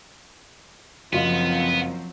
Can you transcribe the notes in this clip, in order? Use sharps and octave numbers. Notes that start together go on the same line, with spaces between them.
F#1 F3 F#3 B3 C4 F4